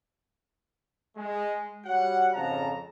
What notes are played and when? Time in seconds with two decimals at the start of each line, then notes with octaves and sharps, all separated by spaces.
1.17 G#3
1.86 G3 F#4 C#5 F#5
2.34 F2 G#2 C#3 F3 A5 A#5